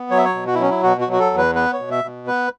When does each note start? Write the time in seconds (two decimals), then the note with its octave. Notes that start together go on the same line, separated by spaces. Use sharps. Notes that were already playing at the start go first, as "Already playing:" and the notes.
Already playing: B3
0.10 F#3 C#5
0.17 E5
0.25 C#5
0.35 B2
0.47 F#4
0.55 E4
0.59 F#3 C#4
0.70 E4
0.83 B2 F#4
1.01 F#4
1.07 F#3
1.13 F#4
1.19 A4
1.31 E2
1.37 B4
1.55 B3 B4
1.73 C#5
1.79 B2
1.91 E5
2.04 B2
2.27 B3 B4